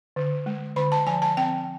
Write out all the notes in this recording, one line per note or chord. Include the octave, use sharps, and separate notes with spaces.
D3
G#3
D3 B5
A5
F3 G#5
A5
C4 G5